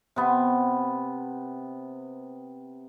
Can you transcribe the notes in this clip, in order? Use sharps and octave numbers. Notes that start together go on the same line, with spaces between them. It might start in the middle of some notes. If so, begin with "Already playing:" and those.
C3 B3